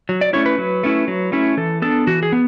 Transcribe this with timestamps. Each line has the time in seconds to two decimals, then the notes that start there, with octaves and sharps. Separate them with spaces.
0.09 F#3
0.21 D5
0.33 A3 C#4 E4 C#5
0.46 B4
0.58 F#3
0.83 A3 C#4 E4
1.08 F#3
1.32 A3 C#4 E4
1.57 E3 A4
1.82 B3 D4 A4
2.07 E3 F#4
2.23 G#4
2.32 B3